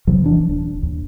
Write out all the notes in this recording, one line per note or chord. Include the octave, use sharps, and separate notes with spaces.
E2 C3 F3 F#3
E3 D4
D#1
D#2